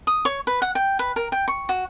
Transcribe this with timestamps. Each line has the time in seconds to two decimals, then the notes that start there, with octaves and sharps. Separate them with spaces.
0.07 D#6
0.25 C#5
0.47 B4
0.62 F#5
0.75 G5
0.99 B4
1.16 A#4
1.32 G5
1.48 C#6
1.69 F#4